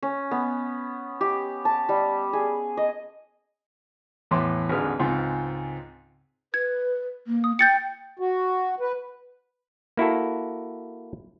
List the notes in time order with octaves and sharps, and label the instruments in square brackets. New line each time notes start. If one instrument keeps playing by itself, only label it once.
[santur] C#4
B3
G4
A5
G3
G#4
D#5
[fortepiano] E2 A2 E3 C6 D6
G#1 D#2 D3 G#4 B4 F6
C#2 G#2 C4 F4
[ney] B4 [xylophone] G#6
[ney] A#3
[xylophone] D#6
[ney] G5 [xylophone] G6 A6 C#7
[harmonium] F#4
B4
[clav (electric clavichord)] A#3 E4 F#4 A4